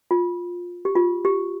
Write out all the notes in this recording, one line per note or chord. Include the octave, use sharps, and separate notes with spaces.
F4
G4
F4
G4